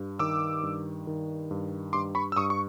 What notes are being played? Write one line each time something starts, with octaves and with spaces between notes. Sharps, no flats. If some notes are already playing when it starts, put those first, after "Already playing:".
Already playing: G2
D#3 D6 E6
G2
D#3
G2
G2 C6 D6
B5 C#6
E6
G2 C#6 D#6
C#6